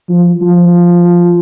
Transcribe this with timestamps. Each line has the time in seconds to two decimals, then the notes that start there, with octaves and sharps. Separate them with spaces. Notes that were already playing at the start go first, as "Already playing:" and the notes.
0.09 F3
0.42 F3